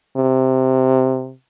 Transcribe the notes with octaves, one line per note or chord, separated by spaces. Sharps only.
C3